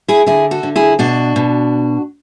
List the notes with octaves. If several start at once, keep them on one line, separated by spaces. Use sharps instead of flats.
E4 G#4
D3 E4 G#4
F#4 A4
D3
E4 G#4
B2 D4 F#4
B2